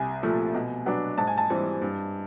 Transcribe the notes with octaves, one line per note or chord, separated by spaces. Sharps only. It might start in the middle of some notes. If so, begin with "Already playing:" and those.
Already playing: C2 G#5
A#2 F3 A3
B2
F#3 B3 D4
G#2 A5
G#5
A5
E3 G3 C4
G2